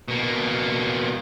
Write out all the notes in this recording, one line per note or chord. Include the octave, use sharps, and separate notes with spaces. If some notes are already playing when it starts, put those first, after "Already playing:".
B2 A#3